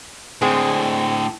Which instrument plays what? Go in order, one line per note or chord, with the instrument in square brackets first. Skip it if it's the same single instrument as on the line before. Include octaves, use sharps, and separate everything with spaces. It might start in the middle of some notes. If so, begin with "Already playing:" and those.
[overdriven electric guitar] A2 D3 [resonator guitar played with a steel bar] G#3 C4 G#4